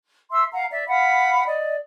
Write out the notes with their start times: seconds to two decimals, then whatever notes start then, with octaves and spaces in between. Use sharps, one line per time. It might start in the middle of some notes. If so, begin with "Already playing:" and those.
0.31 E5 C6 E6
0.52 F5 F#5 A#5
0.71 D5 E5
0.88 F5 F#5 B5
1.45 D5 D#5